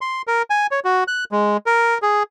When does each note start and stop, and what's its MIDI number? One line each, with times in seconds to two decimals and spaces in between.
0.01 0.22 84
0.27 0.42 70
0.50 0.67 80
0.71 0.80 73
0.85 1.04 66
1.08 1.24 90
1.32 1.57 56
1.66 1.98 70
2.02 2.23 68